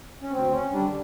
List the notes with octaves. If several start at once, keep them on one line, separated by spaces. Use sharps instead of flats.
C#4
D2 C4
C#4
D3 G3 D4